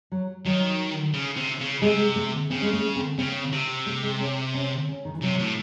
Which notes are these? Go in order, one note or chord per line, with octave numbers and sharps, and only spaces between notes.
F#3
D#3 F#3
C#3
C3
C#3
C3 G#3
A3
C#3 C4
G#3
A3
C4
C#3 C4
C3
A3
G#3
C#4
C#4
C#4
D#3
E3
C3 F#3
A2